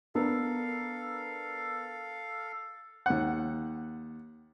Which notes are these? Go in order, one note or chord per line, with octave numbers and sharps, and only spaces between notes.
B3 D4 A4 A#4 F5
D#2 F#5